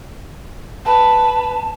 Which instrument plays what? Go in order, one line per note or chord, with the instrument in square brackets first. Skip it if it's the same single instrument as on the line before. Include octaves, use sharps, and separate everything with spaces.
[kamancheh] B4 [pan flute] A5